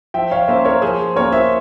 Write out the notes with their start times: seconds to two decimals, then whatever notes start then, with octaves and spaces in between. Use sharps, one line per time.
0.14 F3 E5 G5
0.31 C#5 F5
0.48 A#3 C#4 C5 E5
0.65 A#4 C#5
0.82 F3 G#4 C5
1.16 A#3 C#4 A#4 C#5
1.32 C5 E5